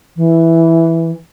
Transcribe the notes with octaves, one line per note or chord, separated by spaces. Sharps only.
E3